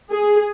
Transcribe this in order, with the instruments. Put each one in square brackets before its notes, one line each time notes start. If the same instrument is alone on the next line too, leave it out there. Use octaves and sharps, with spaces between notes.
[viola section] G#4